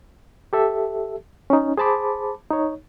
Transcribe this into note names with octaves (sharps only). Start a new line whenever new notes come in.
G4 A4 E5
C#4 D#4
G#4 C5 A5 B5 D6
D#4 C#5